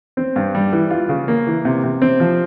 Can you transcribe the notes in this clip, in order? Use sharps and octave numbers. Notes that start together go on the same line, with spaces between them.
C4
G2
G3
E3
F4
C#3
A#3
E3
C3
C3
C4
F3